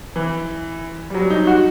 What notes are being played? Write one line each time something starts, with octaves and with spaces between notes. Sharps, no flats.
E3
G3
F#3
D#4
F#4